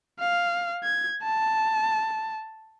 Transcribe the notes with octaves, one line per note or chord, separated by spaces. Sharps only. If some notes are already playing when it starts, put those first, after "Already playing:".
F5
G#6
A5